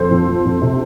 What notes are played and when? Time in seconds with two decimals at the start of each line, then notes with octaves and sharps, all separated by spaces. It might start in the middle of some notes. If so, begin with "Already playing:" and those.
Already playing: F2 F3 A4 C5
0.11 F2
0.28 F3
0.45 F2
0.62 C3